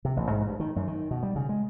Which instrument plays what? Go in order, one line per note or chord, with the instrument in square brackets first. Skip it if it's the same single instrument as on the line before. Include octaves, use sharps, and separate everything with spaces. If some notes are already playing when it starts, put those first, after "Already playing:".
[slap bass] C3
A1
G#2
G2
D#3
F#2
D#3
B2
G3
C#3
G#3